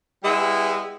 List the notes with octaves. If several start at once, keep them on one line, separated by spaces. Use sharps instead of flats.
G3 G#3 B3 E4 G#4 E5